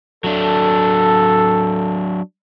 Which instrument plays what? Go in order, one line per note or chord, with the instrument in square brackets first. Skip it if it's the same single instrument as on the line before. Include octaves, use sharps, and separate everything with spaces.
[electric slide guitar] F#3 D4 [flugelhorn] A4